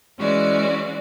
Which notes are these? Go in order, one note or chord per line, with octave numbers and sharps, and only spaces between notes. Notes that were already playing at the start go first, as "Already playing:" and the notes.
E3 G#3 C#4 F#4 D5